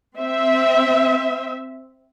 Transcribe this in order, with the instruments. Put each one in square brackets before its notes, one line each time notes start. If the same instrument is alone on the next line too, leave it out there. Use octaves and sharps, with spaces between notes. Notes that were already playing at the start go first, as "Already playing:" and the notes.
[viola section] C4 E5